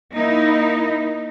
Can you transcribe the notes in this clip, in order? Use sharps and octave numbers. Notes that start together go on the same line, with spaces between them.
A#3 D#4 E4